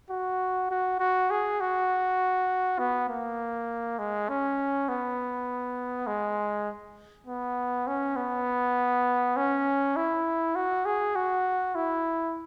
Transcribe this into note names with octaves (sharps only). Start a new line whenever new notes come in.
F#4
F#4
F#4
G#4
F#4
B3
A#3
G#3
C#4
B3
G#3
B3
C#4
B3
C#4
E4
F#4
G#4
F#4
E4